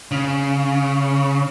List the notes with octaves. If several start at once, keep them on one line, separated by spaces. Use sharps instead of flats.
C#3